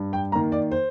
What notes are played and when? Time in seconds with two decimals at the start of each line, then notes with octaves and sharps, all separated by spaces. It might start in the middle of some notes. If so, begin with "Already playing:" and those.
Already playing: G2
0.13 G5
0.32 D#3 A#3 A#5
0.52 D5
0.71 C5